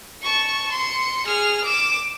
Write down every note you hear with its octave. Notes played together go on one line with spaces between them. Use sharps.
A5 C#6
C6 C#7
G#4 F6
D6 E7